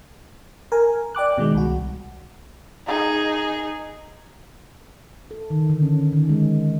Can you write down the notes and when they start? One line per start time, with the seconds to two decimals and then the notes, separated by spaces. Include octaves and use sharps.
0.72 A#4 G#5
1.15 D5 G5 D6 F#6
1.38 B2 D#3 G#3
1.55 C2 F#4
2.86 D#4 G#4
5.31 A4
5.50 D#3
5.70 D3
5.82 C#4
6.12 D#3
6.29 G#3